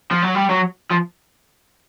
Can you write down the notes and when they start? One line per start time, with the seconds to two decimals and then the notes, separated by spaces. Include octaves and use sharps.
0.11 F3
0.22 F#3
0.35 G3
0.50 F#3
0.91 F3